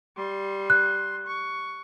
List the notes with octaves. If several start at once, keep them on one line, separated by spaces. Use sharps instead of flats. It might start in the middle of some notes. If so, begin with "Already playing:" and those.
G3 C6
F#6
C#6